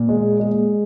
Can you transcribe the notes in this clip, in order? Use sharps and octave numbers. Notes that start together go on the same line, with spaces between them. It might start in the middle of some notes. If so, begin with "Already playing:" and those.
Already playing: A#2
G#3
G#3